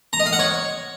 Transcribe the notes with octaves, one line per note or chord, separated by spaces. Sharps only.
A#5
D#5
F5
F#5
C#5